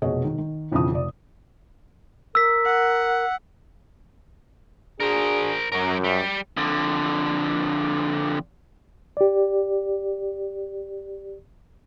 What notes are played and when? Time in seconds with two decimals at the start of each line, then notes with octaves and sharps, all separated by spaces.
0.02 F1 B2 G#4 C#5 D#5
0.24 D#3
0.38 D#3
0.71 B1 F2 C#3 E3 D#6
0.92 F1 D5
2.35 A#4 E6 B6
2.65 F#5
5.00 D4 F#4 G#4 A#4 C5
5.72 F#2 F#3 A#4
6.04 G3
6.57 F2 D3
9.17 G4 D5